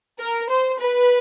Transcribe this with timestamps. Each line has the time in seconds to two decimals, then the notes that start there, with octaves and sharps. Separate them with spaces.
0.19 A#4
0.49 C5
0.80 B4